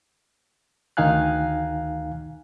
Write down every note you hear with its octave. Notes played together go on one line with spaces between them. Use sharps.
D2 D#3 D#4 F5 G#5 F#6